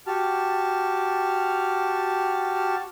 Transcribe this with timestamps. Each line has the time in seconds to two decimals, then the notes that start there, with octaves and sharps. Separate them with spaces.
0.07 F#4 G4 A5 F6